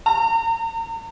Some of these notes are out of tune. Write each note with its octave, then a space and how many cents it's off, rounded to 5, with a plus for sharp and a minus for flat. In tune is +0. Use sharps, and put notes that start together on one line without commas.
A#5 -40